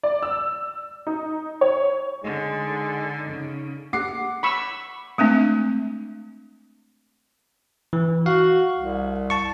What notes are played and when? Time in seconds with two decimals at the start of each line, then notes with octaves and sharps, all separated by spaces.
0.03 D5
0.23 E6
1.07 D#4
1.61 C#5
2.24 D3 G#3 D#4
3.30 C#3
3.93 F#5 D6 C7
4.43 B5 C#6 E6
5.18 G#3 A3 C4 D4
7.93 E3
8.26 F#4 F5
8.78 C2
9.30 A5 C#6